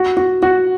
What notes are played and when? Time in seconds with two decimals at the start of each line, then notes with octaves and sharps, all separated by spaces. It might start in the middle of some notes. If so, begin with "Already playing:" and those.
Already playing: F#4
0.17 F#4
0.43 F#4